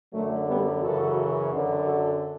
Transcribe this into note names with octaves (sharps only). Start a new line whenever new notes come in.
F#2 D3 F#3 A3
G3 B3
F#2 C#3 E3 F#4 A4
F#2 D3
F#4 A4